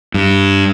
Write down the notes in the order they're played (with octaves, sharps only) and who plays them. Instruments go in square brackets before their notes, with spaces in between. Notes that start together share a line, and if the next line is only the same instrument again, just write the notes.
[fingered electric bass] G2